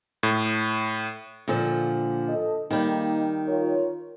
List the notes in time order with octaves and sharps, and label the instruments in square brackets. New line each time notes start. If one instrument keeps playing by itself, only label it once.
[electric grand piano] A2
[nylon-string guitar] A#2 D3 F3
[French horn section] A4 D#5
[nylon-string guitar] D#3 G3 [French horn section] A#3 D#4
[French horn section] F4 A#4 C#5